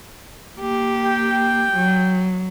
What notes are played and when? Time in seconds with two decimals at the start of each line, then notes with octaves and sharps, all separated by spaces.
0.58 A#3 G4
1.05 G5
1.72 F#3